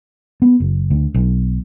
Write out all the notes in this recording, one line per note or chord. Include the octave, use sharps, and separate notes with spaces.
B3
F#1
D2
B1